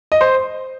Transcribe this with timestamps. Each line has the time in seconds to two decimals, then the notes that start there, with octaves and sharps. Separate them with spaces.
0.12 D#5
0.21 C5